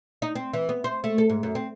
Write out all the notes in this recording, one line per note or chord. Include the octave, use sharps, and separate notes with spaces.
D#4
C4
E3
B3
C5
A3
A4
G#2
F#2
C4